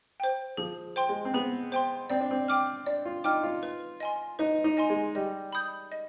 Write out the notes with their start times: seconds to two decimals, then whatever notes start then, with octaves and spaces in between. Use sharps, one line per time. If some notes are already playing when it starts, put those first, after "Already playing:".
0.20 C5 G5
0.57 F3 G#4
0.96 C5 G5 C6
1.09 G#3
1.25 C4
1.34 B3 G#4
1.72 C5 G5 C6
2.10 C4 D5
2.21 D4
2.31 C4
2.48 G5 D6 F6
2.86 D4 D5
3.05 F4
3.24 D#4 G5 D6 F6
3.43 F4
3.63 B4
4.00 D#5 G#5 C6
4.39 D#4 B4
4.64 D#4
4.77 D#5 G#5 C6
4.90 G#3
5.15 G3 D#5
5.52 B5 D#6 G6
5.92 D#5